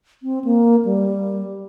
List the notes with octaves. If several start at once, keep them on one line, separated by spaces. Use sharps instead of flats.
C4
A#3
G3